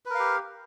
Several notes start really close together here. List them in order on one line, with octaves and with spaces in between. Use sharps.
B4 A#4 F5 G4